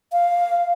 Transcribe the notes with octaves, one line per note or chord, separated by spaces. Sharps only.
F5